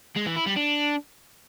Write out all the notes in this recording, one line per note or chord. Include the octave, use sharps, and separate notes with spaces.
G#3
E3
E4
G3
D4